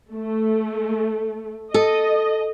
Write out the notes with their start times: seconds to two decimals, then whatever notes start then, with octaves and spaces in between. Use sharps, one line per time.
0.14 A3
1.74 A4 D#5